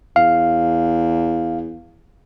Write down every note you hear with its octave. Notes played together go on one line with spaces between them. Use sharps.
E2 F5